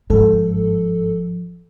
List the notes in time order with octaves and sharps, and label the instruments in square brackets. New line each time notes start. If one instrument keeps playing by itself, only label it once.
[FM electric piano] G1 G#2 A4 [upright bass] F3